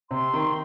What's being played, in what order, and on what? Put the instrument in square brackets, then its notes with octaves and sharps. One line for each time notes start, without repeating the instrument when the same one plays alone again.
[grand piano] C3 [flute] C6
[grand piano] D#3